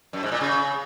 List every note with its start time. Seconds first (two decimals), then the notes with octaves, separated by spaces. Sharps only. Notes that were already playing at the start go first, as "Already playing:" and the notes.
0.13 F#2
0.23 G#2
0.32 A#2
0.41 C#3